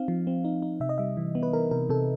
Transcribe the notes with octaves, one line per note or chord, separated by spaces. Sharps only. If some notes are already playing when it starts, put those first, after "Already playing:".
Already playing: C4 D#4 F5
F3
C4
D#4
D#4
C3 E5
D#5
G3 E5
E3
B3
B4
E3 A#4
C3 A#4
C3 A4